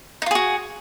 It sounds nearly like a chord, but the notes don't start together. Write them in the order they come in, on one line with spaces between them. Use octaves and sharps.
D#4 F4 G#4 F#4